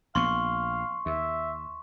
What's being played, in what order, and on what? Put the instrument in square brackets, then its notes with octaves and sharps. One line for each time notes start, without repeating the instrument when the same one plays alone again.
[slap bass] A#1 B3 [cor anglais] F5 [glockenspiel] C6 C#6
[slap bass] D#2 [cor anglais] E5